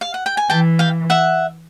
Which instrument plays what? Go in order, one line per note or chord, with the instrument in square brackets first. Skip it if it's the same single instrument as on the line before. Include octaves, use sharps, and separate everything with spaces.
[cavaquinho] F5
F#5
G5
G#5
[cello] E3 [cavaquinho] G5 A5
[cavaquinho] F5 G5
E5 F#5